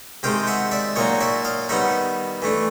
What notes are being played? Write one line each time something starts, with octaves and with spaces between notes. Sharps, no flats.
C3 D#3 G#3 F5 G5
E5 F#5
D5 E5
A#2 F#3 A#3 D#4 C#5 D#5
D5 E5
D#5 F5
D#3 G3 B3 D#4 E5 F#5
E3 A3 D4